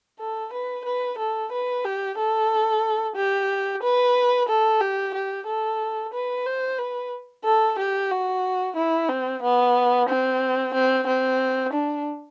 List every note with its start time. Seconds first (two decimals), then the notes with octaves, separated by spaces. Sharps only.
0.19 A4
0.53 B4
0.85 B4
1.18 A4
1.52 B4
1.84 G4
2.18 A4
3.16 G4
3.83 B4
4.49 A4
4.81 G4
5.15 G4
5.47 A4
6.13 B4
6.46 C5
6.79 B4
7.45 A4
7.79 G4
8.11 F#4
8.76 E4
9.09 C4
9.43 B3
10.09 C4
10.74 C4
11.07 C4
11.73 D4